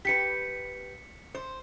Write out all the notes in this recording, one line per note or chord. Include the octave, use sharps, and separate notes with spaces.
G4 B4 B6 C#7
C5